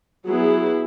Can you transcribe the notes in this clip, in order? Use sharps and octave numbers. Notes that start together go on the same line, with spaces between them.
F#3 B3 E4 G#4